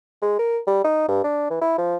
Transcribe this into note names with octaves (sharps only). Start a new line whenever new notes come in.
G#3
A#4
G3
D#4
G2
D4
E3
E4
F3